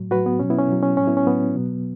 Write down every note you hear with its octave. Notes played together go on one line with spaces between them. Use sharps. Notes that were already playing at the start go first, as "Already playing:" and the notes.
Already playing: A2 F#3
A2 F#3 F#4 B4
B3
B2 F#3 C#4
B3 E4
C#4
B2 F#3
C#4
A2 F#3 C#4
B3 E4
C#4
A2 F#3 B3
B2 F#3